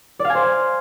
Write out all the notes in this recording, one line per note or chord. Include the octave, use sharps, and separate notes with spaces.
D5
F5
G#5
C5